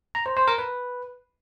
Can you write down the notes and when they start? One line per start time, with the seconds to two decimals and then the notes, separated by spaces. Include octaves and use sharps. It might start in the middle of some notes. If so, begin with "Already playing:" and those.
0.15 A#5
0.26 C5
0.37 C5
0.48 A#4
0.58 B4